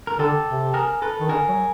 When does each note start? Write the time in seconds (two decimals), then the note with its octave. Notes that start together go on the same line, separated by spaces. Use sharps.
0.07 A#4
0.19 D3 G4 A4
0.47 C3
0.74 G#4 A#4
1.02 A4 B4
1.20 D#3
1.29 D3 G#4 A#4
1.48 F#3